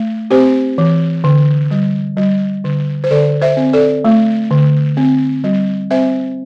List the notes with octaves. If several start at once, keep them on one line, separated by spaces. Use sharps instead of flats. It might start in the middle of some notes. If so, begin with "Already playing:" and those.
Already playing: A3
C4 G4 C5
E3
D3
G3
G3
D3
C5
D3 A4 D5
C5 E5
C4
A4 D5
A3
D3
C4
G3
C4 C5 E5